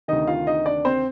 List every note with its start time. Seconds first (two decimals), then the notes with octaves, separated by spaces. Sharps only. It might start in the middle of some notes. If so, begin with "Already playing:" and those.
0.08 D2 C3 D#3 D#4 D#5
0.27 F4 F5
0.47 D#4 D#5
0.66 D4 D5
0.85 C4 C5